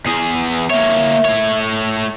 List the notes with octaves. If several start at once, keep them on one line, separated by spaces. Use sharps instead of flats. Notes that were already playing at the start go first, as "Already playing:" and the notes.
E2 G#4
A#3 C#5 E5
A3 C#5